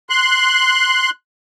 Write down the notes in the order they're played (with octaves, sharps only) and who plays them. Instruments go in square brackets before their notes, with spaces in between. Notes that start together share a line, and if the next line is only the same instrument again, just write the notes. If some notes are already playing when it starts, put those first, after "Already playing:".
[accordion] C6 F#6